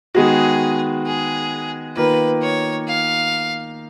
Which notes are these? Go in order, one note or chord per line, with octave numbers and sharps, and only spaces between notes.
D#3 G#3 B3 F#4 G#4
G#4
D#3 A#3 F4 B4
C#5
F5